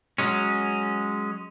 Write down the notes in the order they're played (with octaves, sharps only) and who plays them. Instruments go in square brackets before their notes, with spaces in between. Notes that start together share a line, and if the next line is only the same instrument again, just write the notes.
[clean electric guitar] F#3 G#3 C#4